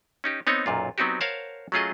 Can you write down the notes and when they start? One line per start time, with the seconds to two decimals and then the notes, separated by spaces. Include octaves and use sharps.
0.24 C#4 D#4 G4
0.47 B3 C4 D#4 C#5
0.66 B1 F#2 A#2 F4
0.98 F#3 B3 C4 D#4 F#4 G4
1.21 A#4 C5 C#5 F5 F#5 A5
1.72 F#3 A3 C#4 F4 G#4 D#5